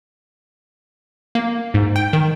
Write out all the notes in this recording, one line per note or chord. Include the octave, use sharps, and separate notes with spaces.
A#3
G#2
G5
D#3